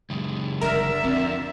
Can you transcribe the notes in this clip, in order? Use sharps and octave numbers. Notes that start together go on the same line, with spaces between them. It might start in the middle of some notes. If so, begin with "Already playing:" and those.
C#2 F#2
G1 D3 A#4 E5
F2 C4